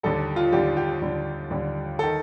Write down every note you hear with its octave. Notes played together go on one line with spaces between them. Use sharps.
D#2 D3 G3 A4
F4
D#2 D3 G3 G4
G4
D#2 D3 G3
D#2 D3 G3
D#3 A4